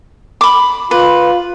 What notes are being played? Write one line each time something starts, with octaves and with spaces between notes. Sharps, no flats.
B5 D6
F4 B4